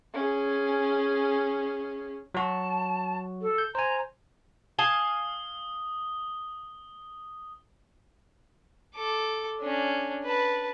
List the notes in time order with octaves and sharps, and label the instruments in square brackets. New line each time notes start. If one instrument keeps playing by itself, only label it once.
[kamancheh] C#4 G#4
[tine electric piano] F#3 F#4 [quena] A5
[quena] A4
[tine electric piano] G6
[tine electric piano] C5 G#5 [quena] A#5
[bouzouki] F5 G#5 A5 [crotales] D#6 G7
[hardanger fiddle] A4 D6
C#4 D4
B4 A5